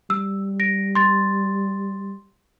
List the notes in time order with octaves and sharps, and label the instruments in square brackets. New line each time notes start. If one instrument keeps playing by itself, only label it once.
[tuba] G3 [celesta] E6
[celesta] A#6 D7
C6 A6